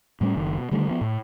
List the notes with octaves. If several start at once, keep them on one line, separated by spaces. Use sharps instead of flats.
A2 G3 A3 C#4
F#1 D#3
B2
D3 D#3 G3 A3
F3 B3
A2